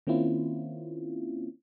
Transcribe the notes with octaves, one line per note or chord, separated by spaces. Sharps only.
D#3 A#3 C4 C#4 E4 F4